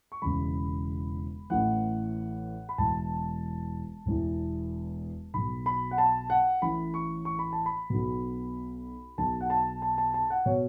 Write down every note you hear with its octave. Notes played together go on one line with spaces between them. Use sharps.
C#6
E1 E2 C#3 E3 B5
A1 A2 E3 F#5
B5
E1 E2 E3 A5
E1 E2 E3
B1 B2 B5
B5
F#5
A5
F#5
A1 A2 E3 B5
C#6
C#6
B5
A5
B5
B1 B2
B1 B2 A5
F#5
A5
A5
A5
A5
F#5
B2 C#5